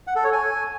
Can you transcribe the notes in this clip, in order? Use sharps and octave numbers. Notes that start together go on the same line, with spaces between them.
F#5
A4
C#5
G#5